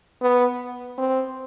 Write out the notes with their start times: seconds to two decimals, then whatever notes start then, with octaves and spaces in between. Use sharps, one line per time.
0.22 B3
0.98 C4